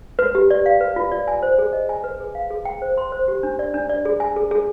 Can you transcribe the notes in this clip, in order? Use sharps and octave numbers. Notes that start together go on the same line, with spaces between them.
B4
G4
D5
F5
B4
F4
D5
G#5
C5
G#4
D#5
G#5
B4
G#4
F5
G#4
G5
C5
C6
C5
G4
D4
D5
D4
D5
G#4
G#5
G#4
G#4